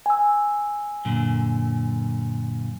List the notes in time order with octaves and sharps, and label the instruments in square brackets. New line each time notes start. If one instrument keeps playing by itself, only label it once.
[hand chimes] G#5 E6
[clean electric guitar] F#2 A#2 D3